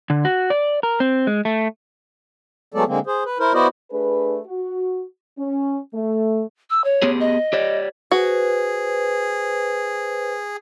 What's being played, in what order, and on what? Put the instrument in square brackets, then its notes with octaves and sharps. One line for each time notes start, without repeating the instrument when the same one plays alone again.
[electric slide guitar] D3
F#4
D5
A#4
C4
G#3
A3
[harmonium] F#3 G#3 A3 B3 A4 D5
D3 G#3 A#3 C4
G#4 C5
B4
E4 A#4 C5
B3 E4 F#4 C5 D5 D#5
[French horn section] A3 D4 G#4 B4
F#4
C#4
A3
[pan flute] E6
C#5
[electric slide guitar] B3 G4 G#4
[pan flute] D#5
[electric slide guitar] G4 C#5 D5
[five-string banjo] F#4 [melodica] G#4 [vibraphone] B4 C5